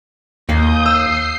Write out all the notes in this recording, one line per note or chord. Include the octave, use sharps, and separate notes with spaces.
D#2 A#3 F5 D#6 G6
E6 C7